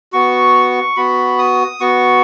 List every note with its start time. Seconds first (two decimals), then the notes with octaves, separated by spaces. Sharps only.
0.13 B3 F#4 C#6
0.97 B3 F#4 B5
1.39 D#6
1.80 B3 F#4 C#6